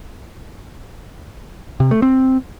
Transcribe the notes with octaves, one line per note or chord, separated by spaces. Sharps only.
C3
A3
C4